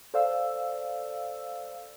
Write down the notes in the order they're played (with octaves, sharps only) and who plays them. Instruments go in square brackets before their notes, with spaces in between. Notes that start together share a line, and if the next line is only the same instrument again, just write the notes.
[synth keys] A4 C5 D5 F5 E6